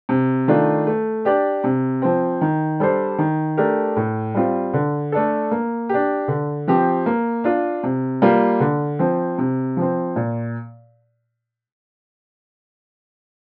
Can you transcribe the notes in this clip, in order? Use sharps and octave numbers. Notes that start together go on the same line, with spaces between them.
C3
D#3 A3 D4 F4
A3
D4 G4 D5
C3
F3 C4
D#3
G3 D4 A4 C5
D#3
A3 D4 G4 A#4
A2
G3 C4 F4
D3
A3 D4 A4
A#3
D4 G4
D3
F3 C4 G4
A#3
D4 F4
C3
G3 A#3 F4
D3
F3 C4
C3
F3 C4
A#2